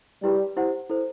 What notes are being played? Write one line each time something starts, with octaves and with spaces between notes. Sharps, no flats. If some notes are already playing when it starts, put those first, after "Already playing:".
G3 E4 G4 B4
E4 G4 C5 F#5
E4 A4 C5